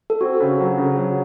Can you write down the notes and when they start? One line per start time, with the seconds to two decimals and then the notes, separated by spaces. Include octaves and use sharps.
0.10 A4
0.21 C4 F#4
0.40 C#3
0.59 F#3
0.78 C#3
0.98 F#3